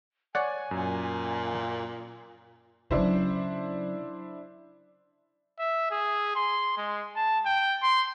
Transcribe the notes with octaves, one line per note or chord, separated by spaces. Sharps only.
C#5 D5 F#5 G#5
F#2 A#2
C#3 F#3 D4 E4 C5
E5
G#4
C6
G#3
A5
G5
C6